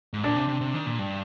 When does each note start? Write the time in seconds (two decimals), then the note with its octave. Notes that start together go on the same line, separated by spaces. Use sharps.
0.13 G#2
0.23 A#2 D4
0.36 C3
0.49 C3
0.61 C3
0.74 D#3
0.86 A#2
0.99 G2